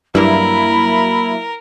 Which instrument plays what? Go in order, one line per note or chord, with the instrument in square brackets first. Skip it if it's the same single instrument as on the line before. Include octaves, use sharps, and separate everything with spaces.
[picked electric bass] G2 [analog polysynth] F#3 A#3 E4 [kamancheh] A#4 [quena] B5